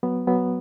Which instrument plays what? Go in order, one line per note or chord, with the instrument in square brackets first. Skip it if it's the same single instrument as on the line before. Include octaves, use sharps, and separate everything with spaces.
[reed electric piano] F#3 B3
F#3 B3